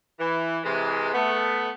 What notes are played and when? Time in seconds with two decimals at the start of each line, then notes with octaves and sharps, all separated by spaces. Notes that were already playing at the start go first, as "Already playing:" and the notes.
0.19 E3
0.64 C3 E3 G#3
1.14 A3 B3